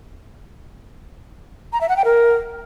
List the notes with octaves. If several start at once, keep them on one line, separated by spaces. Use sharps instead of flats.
A#5
E5
F#5
G5
A#4